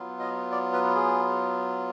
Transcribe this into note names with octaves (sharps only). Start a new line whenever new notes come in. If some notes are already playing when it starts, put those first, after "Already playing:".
Already playing: F#3 B3 F4
D#5
D5
B4
G#4